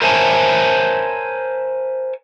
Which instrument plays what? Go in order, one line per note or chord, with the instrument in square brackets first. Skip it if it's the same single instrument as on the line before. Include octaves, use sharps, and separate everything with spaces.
[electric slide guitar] A#4 C5 C#5 E5 G#5 A5